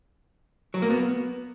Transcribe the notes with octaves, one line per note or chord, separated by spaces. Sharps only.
F#3
A#3
B3